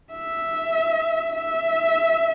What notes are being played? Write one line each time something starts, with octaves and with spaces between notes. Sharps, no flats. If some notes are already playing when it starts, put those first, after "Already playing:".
E5
E5